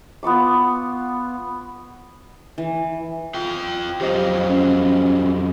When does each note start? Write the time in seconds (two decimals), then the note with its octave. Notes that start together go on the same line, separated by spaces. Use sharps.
0.23 B3 F4 C#6 D6
2.58 E3
3.34 F4 G5
4.01 F2 F#3 F4 G4 C5 D#5
4.48 C#4